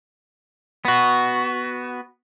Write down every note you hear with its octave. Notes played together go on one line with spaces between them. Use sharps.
B3 F#4